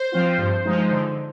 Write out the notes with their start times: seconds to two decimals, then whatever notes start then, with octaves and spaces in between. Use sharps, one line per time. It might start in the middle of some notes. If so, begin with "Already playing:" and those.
Already playing: C5
0.12 F3 C4 F4
0.38 G2
0.65 F3 G#3 D#4
0.90 D3